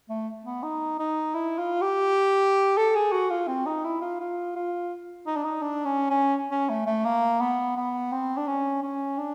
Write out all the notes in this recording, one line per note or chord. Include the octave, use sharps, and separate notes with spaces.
A3
B3
D#4
D#4
E4
F4
G4
A4
G#4
F#4
F4
C4
D#4
E4
F4
F4
F4
D#4
D4
D#4
D4
C#4
C#4
C#4
A3
A3
A#3
B3
B3
C4
D4
C#4
C#4
D4